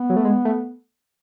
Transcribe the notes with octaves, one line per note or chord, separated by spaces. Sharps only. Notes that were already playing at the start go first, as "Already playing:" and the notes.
Already playing: B3
F#3
A3
G#3
A3